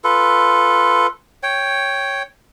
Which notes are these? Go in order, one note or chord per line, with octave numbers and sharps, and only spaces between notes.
F4 A4 B4
C#5 G5